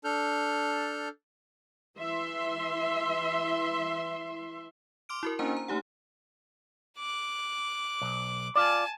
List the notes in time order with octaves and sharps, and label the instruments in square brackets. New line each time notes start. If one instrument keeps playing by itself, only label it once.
[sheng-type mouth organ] D4 A4 F6 G6
[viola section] E3 E5 C6
[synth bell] C6 D6 F6 D7
E4 F#4 A#4
A#3 C#4 D4 C5 G#5 A#5
A#5
A3 D#4 G4 F#5
[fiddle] D6 F#6
[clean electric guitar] B1
[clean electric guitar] F4 D5 [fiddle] G#5 A5